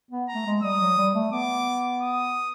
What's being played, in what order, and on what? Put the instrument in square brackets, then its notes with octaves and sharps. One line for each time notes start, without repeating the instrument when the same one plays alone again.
[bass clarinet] B3
[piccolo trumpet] A#5
[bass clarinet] A3
G#3
[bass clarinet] G3 [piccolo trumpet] D#6
[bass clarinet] F#3
G3
A3
[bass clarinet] B3 [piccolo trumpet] D6
[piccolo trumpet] D#6